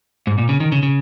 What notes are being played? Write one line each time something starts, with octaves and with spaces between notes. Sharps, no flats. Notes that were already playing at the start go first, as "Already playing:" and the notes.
G#2
A#2
C#3
D#3
C#3
C#3